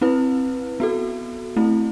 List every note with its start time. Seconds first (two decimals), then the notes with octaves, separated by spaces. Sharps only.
0.01 C4 E4 B4
0.80 B3 F#4 A4
1.56 A3 C4 E4